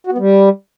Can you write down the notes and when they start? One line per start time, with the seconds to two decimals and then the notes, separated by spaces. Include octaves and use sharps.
0.07 F#4
0.12 B3
0.18 G3